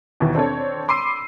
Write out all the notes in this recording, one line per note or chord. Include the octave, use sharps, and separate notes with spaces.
D#2 B2 D#3 E3
C4 D4 A4 C#5
B5 C6 D6 E6 C7 D#7